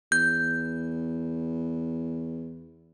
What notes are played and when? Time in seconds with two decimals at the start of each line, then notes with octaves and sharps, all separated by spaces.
0.12 E2 G6